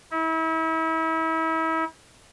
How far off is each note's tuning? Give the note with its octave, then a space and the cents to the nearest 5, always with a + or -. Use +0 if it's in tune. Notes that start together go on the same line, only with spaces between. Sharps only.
E4 -35